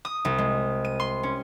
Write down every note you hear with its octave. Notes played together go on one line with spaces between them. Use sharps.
D#6
C2
G#3
D#7
C6
C#4